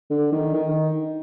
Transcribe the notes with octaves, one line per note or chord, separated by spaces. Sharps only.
D3
D#3
D#3